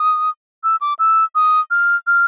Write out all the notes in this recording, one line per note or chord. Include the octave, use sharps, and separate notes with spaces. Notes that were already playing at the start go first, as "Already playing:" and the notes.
Already playing: D#6
E6
D6
E6
D#6
F6
F6